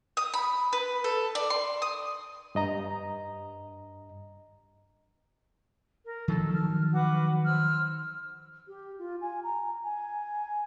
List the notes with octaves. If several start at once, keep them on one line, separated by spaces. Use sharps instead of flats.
D#6
B5
B4
A4
D5
C6
D#6
G2 D#5 A#5
A#4
D#3 F3 F#3 A4
F6
F#4 B4 D6
C5 E6 F6
G4
F4
G#5
A#5
G#5